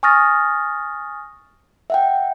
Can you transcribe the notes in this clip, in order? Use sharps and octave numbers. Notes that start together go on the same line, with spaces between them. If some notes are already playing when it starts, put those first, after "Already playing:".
G#5 C#6 D#6 F6 A6 A#6
E5 F#5 G5